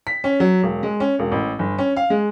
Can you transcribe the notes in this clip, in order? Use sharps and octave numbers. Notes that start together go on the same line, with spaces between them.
B6
C#4
F#3
E1
G#3
C#4
E1
A1
G1
C#4
F5
G#3